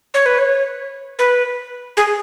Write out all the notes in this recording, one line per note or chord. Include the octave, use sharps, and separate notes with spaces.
C#5
B4
C#5
B4
G#4